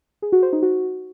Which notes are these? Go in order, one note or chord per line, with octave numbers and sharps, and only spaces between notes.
G#4
F#4
C5
D#4
F#4